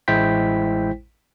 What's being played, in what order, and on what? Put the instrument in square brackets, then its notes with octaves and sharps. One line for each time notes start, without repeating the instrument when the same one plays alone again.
[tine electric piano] A1 G#3 E4 C5 G5 B6